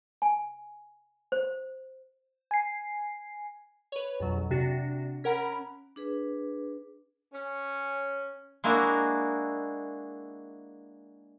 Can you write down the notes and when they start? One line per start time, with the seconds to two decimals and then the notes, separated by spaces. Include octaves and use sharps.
0.22 G#5
1.32 C5
2.51 G#5 C7
3.92 B4 C#5
4.20 A#1 F2 B2 F#3
4.51 C3 D4 F#4
5.24 C#4 A#4 F#5 A#5 B5
5.96 D4 G#4 B4
7.33 C#4
8.64 G#3 A#3 D4 E4 F#4 A#4